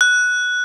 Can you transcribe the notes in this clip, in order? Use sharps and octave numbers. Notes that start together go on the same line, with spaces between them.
F#6